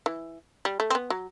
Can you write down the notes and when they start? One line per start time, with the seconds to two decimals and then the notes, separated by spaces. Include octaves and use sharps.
0.06 E3
0.65 G3
0.80 A3
0.90 C4
0.95 B3
1.10 F#3